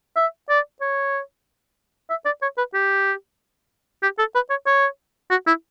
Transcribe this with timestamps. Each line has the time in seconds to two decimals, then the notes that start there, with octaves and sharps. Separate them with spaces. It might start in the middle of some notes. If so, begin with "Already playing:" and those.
0.16 E5
0.49 D5
0.81 C#5
2.10 E5
2.25 D5
2.42 C#5
2.58 B4
2.74 G4
4.02 G4
4.19 A4
4.35 B4
4.50 C#5
4.67 C#5
5.30 F#4
5.47 E4